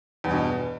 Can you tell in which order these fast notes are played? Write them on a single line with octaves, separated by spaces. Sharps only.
E2 G2 B2